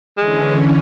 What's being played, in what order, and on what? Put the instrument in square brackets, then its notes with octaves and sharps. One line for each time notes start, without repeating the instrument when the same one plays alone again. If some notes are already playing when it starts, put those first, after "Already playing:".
[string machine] D3 E3 C#4 [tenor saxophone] G#3